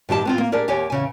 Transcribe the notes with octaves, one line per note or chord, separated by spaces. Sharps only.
G2 D#3 G4 A5
B3 C4 F4
A#3
D4 G4 G#4 A#4 D5
D#2 G4 C#5 G#5
E2 C#3 G#5